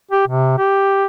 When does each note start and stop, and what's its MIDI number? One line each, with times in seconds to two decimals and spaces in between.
0.11 0.24 67
0.27 0.56 48
0.58 1.06 67